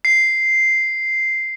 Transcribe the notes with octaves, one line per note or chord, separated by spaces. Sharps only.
C7